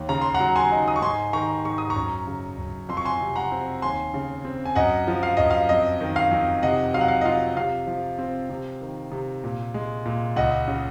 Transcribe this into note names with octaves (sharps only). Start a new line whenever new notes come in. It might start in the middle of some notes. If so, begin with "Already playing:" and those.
Already playing: D#2
C#3 A#5
C6
F#5 A#5
F#3
G#5 C6
D#4
D#6
C#6
G#2 G#5 C6
D#3 A#5 C#6
G#2 C#6
D#6
A#5 C#6
F#2
C#3
F#2
F2 C6
C#6
G#5 C6
C3
F#5 A#5
C4
D#2 G#5 C6
C#3
C4
G#5
F#2 D#5 F#5
F3
F5
F#2 D#5
F5
F2 D#5
D#3
F5
F2
C3 D#5 F#5
F#3 F5
F#5
F5
D#5
F4 F5
C3 F5
F3
C4
C3
D#3
C3
A#2
G#3
A#2
C#2 D#5 F#5
C#3